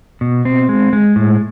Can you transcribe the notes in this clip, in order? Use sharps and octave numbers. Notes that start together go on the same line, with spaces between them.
B2
C4
G#3
G#3
A2